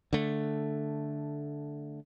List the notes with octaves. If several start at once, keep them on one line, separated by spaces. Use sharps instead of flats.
D3 A3